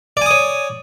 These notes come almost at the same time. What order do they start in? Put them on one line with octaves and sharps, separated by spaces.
D5 G#5 D#6 C#5